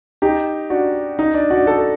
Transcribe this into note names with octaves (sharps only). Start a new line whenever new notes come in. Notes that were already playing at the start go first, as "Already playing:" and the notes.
D#4 G4
D4 F#4
D#4
D4
D4 F#4
F#4 A4